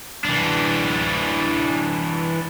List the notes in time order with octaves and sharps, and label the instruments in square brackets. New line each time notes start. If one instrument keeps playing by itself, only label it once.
[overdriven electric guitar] E3 D4